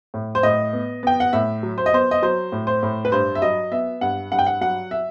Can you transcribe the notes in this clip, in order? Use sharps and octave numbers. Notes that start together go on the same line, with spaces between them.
A2
C5
A2 D#5
B3
B3 G5
F#5
A2 E5
F#3
C5
D#5
B3 C5
D#5
F#3 C5
A2
C5
A2
B4
G2 C5
E5
F#3 D#5
B3 E5
G2 F#5
G2 F#5
G5
F#5
F#3 F#5
E5